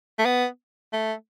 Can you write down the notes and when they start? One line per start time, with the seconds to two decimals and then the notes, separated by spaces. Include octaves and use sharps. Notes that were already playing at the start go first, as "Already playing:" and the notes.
0.19 A3
0.25 B3
0.93 A3